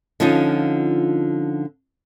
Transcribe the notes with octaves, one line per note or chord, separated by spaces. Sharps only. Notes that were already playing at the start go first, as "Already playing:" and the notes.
D3 F3 C#4 D#4 F4